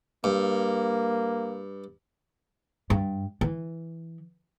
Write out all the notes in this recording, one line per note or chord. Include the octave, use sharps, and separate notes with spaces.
G2 A#3
G2
E3